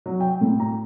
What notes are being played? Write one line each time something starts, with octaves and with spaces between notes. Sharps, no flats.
F#3
G5
A2
A#5